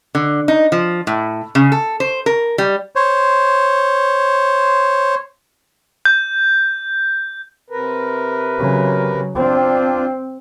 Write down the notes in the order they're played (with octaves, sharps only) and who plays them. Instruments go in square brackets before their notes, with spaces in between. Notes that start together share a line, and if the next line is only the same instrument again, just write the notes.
[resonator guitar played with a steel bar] D3
D#4
F3
A2
C#3
A4
C5
A#4
G3
[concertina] C5 C#5
[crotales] G6
[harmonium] C3 A#4 B4
[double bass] C#3 F#3
[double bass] C4 [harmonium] D4 F4